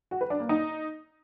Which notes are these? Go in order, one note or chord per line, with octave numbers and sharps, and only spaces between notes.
F#4
B4
D4
A#3
D#4